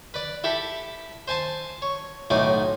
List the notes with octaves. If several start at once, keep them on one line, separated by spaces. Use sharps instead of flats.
B4 D5
E4 G4 A4 B5
C5 G#5 A5 C6
C#5
B1 A2 D#4 G#5 D6